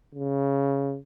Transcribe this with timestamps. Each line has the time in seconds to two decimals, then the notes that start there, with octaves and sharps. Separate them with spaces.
0.15 C#3